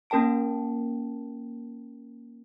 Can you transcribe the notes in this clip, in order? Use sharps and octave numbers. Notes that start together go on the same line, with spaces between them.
A#3 C#4 A#4 G5 A5 D7